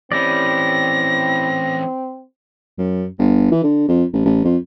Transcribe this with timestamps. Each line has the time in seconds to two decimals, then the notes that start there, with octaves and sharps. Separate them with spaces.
0.12 E3 C4 C#4 E4 G4 D5 A#6
2.78 F#2
3.19 G1
3.52 E3
3.64 D3
3.88 F2
4.13 A1
4.25 A1
4.45 F2